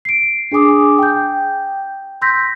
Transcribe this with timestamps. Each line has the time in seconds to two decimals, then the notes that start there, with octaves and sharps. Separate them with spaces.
0.05 C7 D7
0.52 D4 G#4 G#5 D6 D#6
0.98 G5 G6
2.22 C6 E6 G6 A#6 B6